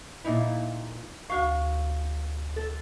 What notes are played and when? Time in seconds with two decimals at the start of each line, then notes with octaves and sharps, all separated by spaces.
0.25 A#2 D#4 E4
1.30 D2 F#4 F5 C#6
2.56 A4